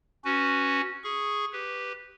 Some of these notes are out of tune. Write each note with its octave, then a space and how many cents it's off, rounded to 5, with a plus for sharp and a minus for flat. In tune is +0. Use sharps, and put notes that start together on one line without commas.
C#4 +0 F#4 +0 B4 +0
G#4 +0 C#6 -5
G4 +0 B4 +0